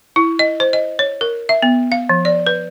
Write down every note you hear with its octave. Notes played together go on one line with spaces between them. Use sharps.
E4
D#5
C5
D#5
C#5
A#4
E5
B3
F5
F3
D5
B4